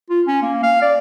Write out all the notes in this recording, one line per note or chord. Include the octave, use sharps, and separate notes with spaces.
F4
C#4
A#3
F5
D5